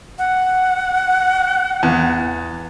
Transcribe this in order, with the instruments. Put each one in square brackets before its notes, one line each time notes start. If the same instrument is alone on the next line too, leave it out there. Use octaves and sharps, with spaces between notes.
[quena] F#5
[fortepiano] E2